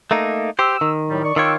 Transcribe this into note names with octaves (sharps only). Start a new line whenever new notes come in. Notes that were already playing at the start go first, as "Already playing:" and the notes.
A3 A#3 D#4
G4 C5 E6
D#3
A2 F#3 G3
D5 C#6
D#3 F4 C#5 G5 D6 E6